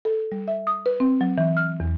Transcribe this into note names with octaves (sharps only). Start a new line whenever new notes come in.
A4
G3
E5
D#6
B4
C4
F#3
E3
F6
E2